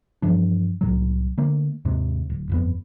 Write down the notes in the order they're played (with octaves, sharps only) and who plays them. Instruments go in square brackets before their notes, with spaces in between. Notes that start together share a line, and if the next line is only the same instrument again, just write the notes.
[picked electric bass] G2 E3 F3 D4
C2 A2 F#3
D3 A3 A#3
D#2 G#2 C3
D1
G1 F2 B3